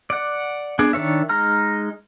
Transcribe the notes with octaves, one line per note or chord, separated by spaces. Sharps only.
D5 F#5
B3 D4 G#4 D5
D#3 D4 C#5 E5
G#3 D#4 A#5 F6